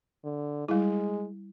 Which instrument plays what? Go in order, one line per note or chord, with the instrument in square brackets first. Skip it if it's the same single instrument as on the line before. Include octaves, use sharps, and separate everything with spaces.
[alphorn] D3
[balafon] G3 E4 [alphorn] G#3